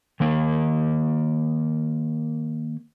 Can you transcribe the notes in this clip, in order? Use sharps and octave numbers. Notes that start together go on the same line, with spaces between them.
D#3 A#3 A#4